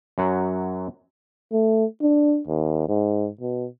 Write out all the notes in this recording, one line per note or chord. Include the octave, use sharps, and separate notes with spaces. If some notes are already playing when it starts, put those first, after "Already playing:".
F#2 F#3 F#5
A3
D4
D#2
G#2
B2